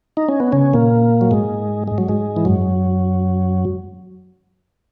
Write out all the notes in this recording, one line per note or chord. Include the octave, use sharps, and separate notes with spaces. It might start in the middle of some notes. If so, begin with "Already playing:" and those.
D#4
C#4
B3
C#3 C#4
A#2 A#3
F#3
G#2 G#3
G#3
F#3
G#2 G#3
E3
F#2 F#3